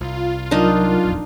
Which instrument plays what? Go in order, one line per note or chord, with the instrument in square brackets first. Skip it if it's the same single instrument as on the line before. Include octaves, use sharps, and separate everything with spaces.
[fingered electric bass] C2 [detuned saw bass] F4
[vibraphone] F#3 A#4 [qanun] D4 D#4
[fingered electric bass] D#1 A#1 F2